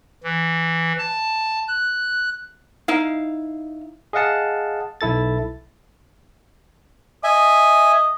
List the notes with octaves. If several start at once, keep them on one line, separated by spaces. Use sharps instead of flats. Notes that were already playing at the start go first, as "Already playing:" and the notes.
E3
A5
F#6
D#4 E4 F5
G#4 D#5 F5 F#5 A5
B1 E4 A4 A6
D#5 E5 G#5